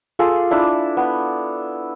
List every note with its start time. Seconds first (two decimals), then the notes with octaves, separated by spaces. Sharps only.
0.19 F4 G#4 A4 D6
0.51 D4 E4 A5
0.97 B3